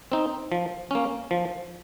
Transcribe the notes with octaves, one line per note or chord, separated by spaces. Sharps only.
C4 D#4
F3
A#3 C#4
F3